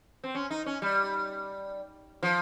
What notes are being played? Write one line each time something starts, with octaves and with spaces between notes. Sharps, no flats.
C4
C#4
D#4
C#4
G3
F3